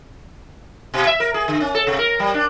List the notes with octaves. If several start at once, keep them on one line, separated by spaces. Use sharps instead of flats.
B2
E5
A#4
G#4
D3
C#4
A4
C3
A#4
G3
D4